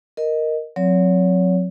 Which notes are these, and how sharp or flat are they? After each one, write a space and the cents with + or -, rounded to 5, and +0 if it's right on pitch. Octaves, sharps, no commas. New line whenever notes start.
A#4 +0 D#5 +0
F#3 -30 C4 +0 C#5 +35